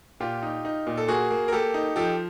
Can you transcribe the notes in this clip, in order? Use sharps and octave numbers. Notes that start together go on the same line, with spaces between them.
A#2 F4 G4
D#4
D#4
A#2
A4
A#3 F#4 G#4
A#3
A#4
A#3 G4 A4
D#4
F3 G4 A4